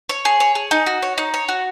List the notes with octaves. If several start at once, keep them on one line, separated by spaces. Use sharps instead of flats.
C#5
G#4
C#5
G#4
D#4
F#4
C#5
D#4
C#5
F#4